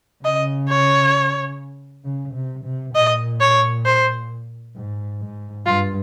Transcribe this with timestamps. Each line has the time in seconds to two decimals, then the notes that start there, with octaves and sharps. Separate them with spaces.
0.24 C#3 D#5
0.69 C#5
2.05 C#3
2.35 C3
2.65 C3
2.95 A#2 D#5
3.40 C#5
3.85 C5
4.76 G#2
5.21 G#2
5.66 G2 F4